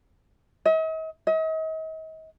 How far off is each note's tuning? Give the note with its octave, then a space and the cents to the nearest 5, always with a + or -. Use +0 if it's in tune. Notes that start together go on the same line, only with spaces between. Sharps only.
D#5 +45
D#5 +40